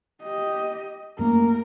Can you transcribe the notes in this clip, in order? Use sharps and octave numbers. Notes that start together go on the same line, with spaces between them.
G4 D#5
F#2 A3 A#3 A#4